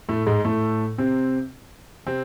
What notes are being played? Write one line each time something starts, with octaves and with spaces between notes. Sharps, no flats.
A2 A3
G#2 G#3
A2 A3
C3 C4
C3 C4